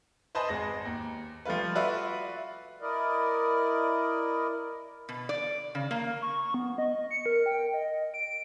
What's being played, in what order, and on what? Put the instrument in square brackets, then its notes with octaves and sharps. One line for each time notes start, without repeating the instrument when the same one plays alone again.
[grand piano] B4 C5 D#5 G#5 A5 B5
G#1 G#3 A#6
D#2
F3 G3 A3 F4 B4
F4 F#4 B4 D5 E5
[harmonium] E4 A#4 D5 D#5
[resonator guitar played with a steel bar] B2
D5
C#3
A#3
[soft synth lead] C#6
B3
D#5
C#7
A#4
G5
D#5
D7